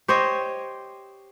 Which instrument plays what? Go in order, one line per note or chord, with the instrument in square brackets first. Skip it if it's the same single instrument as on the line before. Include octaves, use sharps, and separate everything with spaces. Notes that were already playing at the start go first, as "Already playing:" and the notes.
[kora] G4 C5 C#5 D#5